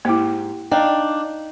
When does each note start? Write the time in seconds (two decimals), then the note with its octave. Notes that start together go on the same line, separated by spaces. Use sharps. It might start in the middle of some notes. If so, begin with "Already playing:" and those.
0.05 G#2 A#3 E4 G4
0.71 D4 D#4 D5 F5 G5